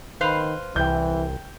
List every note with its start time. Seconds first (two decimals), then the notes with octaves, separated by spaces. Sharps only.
0.21 D#3 B4 C5 F5
0.76 C2 E3 G5 G6